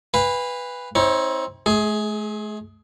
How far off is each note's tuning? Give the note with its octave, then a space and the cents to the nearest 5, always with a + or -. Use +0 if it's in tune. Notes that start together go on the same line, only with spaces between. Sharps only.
B4 +0 F5 +0 G#5 -40
C4 +10 D#4 +45 C#5 -10
A3 -45 G#4 +10